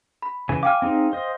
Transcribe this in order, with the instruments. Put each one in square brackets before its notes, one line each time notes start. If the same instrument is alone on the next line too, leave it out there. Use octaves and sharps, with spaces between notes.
[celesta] B5
[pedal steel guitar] C#3 E3 G#5
[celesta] F5 G5 F6 [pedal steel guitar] G#5 D6
[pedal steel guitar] C4 D#4 G#4
C5 D#5